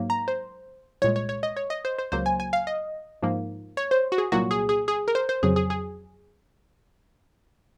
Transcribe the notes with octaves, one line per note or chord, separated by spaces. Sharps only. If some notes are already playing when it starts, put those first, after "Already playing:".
Already playing: G#2 F#3 A#3
A#5
C5
C2 A#2 G#3 C#5
C#5
C#5
D#5
C#5
D#5
C5
C5
C#2 C#3 F#3 A#3 C5
G#5
G#5
F5
D#5
G#2 F3 A#3
C#5
C5
F#4
G#4
C2 A#2 F#3 A#3 F#4
G#4
G#4
G#4
A#4
C5
C5
F2 C#3 F#3 G#4
G#4
G#4